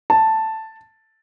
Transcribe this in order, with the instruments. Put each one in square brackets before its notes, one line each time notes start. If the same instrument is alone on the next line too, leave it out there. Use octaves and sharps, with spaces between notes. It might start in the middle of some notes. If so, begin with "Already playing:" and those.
[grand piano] A5